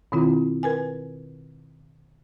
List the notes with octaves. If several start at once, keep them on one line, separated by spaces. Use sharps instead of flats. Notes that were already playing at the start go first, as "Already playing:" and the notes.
B2 D#3 C4 E4 F4
A#4 B4 G#5